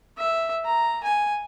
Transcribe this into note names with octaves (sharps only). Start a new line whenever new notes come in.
E5
A#5
G#5